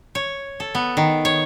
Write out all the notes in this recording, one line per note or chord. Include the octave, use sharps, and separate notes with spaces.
C#5
A4
B3
D#3
C#5